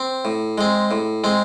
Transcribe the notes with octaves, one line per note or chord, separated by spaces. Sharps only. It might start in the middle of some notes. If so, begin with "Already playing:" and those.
Already playing: C4
A2
G#3 C4
A2
G#3 C4